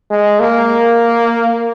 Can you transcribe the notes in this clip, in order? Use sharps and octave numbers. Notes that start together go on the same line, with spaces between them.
G#3
A#3